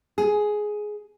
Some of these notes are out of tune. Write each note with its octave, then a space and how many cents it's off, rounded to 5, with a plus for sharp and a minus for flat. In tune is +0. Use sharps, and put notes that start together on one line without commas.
G#4 +10